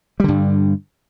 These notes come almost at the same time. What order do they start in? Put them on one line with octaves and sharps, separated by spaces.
G3 D3 G2